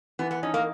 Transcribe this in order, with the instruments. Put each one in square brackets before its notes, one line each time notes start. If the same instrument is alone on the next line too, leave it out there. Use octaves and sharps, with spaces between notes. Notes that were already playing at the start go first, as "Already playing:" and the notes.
[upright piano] E3 [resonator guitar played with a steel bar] B3
[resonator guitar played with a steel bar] B3
[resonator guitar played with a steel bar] C#4 [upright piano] D#4
[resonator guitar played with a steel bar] A#3